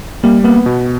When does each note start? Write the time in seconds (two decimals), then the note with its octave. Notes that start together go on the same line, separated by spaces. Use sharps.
0.24 G3 A#3
0.44 A#3 B3
0.66 B2